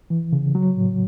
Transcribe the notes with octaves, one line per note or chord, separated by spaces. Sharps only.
E3
C#3
F#3
A2